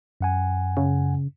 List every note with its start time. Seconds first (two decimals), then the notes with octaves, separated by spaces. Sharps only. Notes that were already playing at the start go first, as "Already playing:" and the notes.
0.21 F#2 F#5 G#5
0.77 C#3